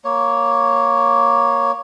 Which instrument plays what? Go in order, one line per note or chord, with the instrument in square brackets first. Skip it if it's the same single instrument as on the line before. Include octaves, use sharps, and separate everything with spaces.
[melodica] A#3 C#5